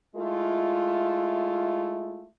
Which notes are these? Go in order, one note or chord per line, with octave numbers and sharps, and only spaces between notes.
G#3 A3 E4 F4